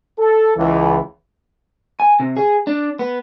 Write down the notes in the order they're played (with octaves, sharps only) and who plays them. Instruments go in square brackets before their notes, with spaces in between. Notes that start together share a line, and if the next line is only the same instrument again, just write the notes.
[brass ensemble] A4
C#2 E3
[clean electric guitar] G#5
C3
G#4
D4
B3